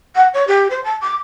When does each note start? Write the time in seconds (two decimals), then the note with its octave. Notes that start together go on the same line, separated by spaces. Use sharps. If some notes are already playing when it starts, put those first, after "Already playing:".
0.16 F#5
0.34 C#5
0.47 G4
0.70 C5
0.84 A5
1.01 D6